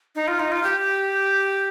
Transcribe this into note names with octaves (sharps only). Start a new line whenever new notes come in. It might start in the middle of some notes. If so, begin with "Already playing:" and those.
D#4
F4
D#4
F4
G4